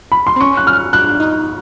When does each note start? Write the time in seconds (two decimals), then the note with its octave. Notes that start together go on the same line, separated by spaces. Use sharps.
0.12 B5
0.27 C6
0.36 C4
0.40 C#4 C#6
0.57 F#6
0.67 F6
0.93 D4 F#6
1.20 D#4